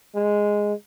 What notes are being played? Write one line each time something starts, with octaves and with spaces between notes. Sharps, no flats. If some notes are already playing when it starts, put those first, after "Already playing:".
G#3